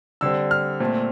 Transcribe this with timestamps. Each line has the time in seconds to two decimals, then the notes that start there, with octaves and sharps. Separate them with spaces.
0.21 D3 G3 C4 E6
0.51 F6
0.80 A#2 A3 C4